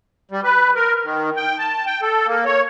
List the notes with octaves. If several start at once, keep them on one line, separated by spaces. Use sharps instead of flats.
G3
B4
A#4
D#3
G5
A5
G5
A4
A#3
C#5